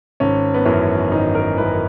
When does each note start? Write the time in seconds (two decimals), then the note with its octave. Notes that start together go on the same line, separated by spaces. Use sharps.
0.20 G#1 C#4
0.54 B3
0.65 F#2 E3 C#4
1.11 G#1 D#4
1.35 A#4
1.57 F#2 E3 B4